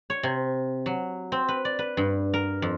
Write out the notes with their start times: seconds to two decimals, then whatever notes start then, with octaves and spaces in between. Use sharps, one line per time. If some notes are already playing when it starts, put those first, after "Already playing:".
0.10 C#5
0.23 C3
0.86 F#3
1.32 C4
1.49 B4
1.65 D5
1.79 B4
1.97 G2
2.34 A#4
2.62 F2